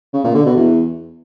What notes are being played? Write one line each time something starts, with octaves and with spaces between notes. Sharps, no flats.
C#3
A#2
D3
B2
E2